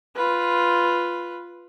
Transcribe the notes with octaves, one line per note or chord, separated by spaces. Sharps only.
F4 B4